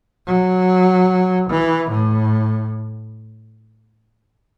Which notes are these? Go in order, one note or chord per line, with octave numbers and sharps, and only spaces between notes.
F#3
E3
A2